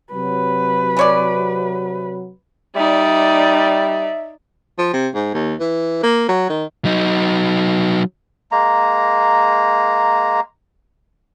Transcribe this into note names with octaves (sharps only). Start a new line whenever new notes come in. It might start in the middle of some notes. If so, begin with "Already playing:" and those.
C3 F#3 B4
E3 C#5 D5
G3 D#4 D5 E5
F3
C3
G#2
D#2
E3
A#3
F#3
D#3
F#3 D#4
G#3 A#3 A#5